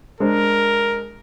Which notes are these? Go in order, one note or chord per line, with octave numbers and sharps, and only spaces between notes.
G#3 D4 A#4 C5